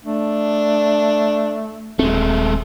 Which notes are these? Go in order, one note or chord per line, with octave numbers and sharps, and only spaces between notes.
A3 D4
D#1 G#3 A3 C4